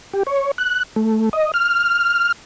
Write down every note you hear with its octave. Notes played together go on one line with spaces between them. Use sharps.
G4
C#5
F#6
A3
D#5
F6